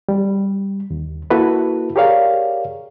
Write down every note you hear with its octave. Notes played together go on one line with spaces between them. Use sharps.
G3
D#2
A#3 E4 F#4 A4 B4
G4 G#4 A#4 C#5 D5 F5